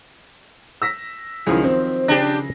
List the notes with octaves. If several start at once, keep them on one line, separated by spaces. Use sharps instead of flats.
E6 A#6 B6
C#2 D#3 F3 F#3 E4 G#4
C4 C5
C#3 D4 G4 A#6